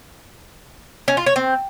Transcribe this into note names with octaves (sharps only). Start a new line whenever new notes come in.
C#4
F4
C#5
C4